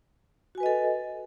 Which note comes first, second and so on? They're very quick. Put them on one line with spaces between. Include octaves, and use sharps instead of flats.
F#4 G#5 B4 D#5 A4